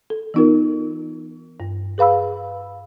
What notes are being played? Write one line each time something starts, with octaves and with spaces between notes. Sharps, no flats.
A4
E3 B3 D#4 F4 A#4
G2
G#4 B4 F5 B5 E6